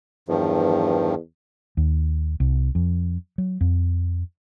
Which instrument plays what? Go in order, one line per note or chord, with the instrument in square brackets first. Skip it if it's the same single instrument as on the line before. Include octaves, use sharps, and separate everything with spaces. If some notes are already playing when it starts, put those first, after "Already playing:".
[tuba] E2 [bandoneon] G2 D#3 F3
[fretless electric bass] D#2
C2
F2
F#3
F2